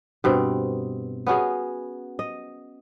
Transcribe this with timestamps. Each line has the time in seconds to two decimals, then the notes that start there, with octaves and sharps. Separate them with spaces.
0.24 G2 B2 C4
1.27 B3 C#4 F#4 G#4
2.19 D#5